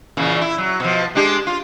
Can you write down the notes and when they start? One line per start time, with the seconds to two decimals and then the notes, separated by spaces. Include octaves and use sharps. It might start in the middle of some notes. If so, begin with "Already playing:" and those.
0.17 A#2 C#3 E3
0.41 E4
0.58 F#3
0.80 B2 F3
1.15 G#3 D4 G4
1.47 F4